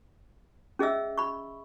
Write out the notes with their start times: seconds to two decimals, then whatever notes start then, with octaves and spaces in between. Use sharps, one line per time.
0.79 C#4 G#4 D#5 E5 E6
1.18 B5 C#6